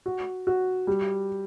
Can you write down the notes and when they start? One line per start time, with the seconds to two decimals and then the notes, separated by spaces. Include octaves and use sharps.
0.06 F#4
0.47 F#4
0.87 G3